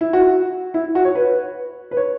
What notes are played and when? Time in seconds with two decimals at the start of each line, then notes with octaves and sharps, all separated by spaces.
0.01 E4
0.13 F#4
0.74 E4
0.95 F#4
1.05 C#5
1.15 B4
1.91 B4
1.97 C#5